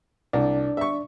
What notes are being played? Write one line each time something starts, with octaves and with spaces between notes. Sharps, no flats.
C2 D4 D5
E5 C#6